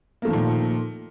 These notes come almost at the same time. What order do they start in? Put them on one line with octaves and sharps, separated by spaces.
A#3 A3 F3 D#3 A#2